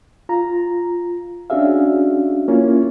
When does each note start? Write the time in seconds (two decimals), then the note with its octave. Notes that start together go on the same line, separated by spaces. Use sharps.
0.29 F4 A#5
1.50 C#4 D4 F#4 G#4 E5 F5
2.48 A#3 C#4 E4 F4